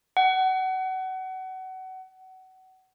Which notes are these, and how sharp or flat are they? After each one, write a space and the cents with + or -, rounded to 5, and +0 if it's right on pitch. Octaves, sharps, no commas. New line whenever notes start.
F#5 +25